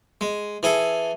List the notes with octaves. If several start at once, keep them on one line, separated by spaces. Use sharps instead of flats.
G#3
E3 G#4 A4